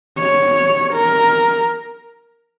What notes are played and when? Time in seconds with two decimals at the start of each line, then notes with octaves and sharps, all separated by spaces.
0.18 C#5
0.94 A#4